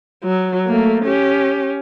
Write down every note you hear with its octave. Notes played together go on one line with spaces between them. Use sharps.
F#3
A3 A#3
C#4 G4